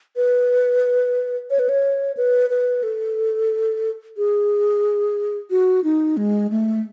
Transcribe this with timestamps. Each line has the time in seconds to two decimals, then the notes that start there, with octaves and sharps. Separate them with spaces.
0.16 B4
1.50 C#5
1.59 B4
1.69 C#5
2.17 B4
2.50 B4
2.83 A4
4.17 G#4
5.50 F#4
5.84 D#4
6.17 G#3
6.51 A3